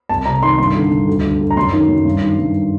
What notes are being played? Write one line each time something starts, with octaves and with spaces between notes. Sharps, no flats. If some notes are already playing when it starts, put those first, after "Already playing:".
C2 A5
C3 A#5
D#3 C6
G2 C6
D3
G2
D2
D3
D2
A#5
F#2 C6
D#3
F#2
G2
D#3
G2